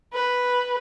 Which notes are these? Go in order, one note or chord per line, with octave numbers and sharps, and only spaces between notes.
B4